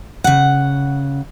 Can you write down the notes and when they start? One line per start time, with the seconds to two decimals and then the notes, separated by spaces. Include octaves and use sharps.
0.24 C#3 F#5